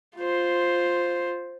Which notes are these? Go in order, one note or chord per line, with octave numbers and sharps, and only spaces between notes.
F4 C5